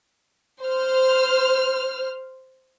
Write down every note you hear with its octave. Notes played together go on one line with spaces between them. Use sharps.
C5 F6